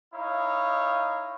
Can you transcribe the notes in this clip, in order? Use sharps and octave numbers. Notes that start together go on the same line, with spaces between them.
D#4 E4 C#5 D#5 F5